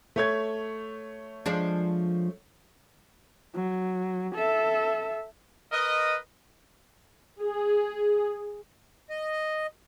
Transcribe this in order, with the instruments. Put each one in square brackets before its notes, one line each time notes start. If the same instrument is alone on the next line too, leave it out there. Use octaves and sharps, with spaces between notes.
[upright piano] A3 C#5 G#6
[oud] F3 G#3 D4
[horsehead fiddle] F#3
A4 E5
[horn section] A#4 B4 D#5
[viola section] G#4
[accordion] D#5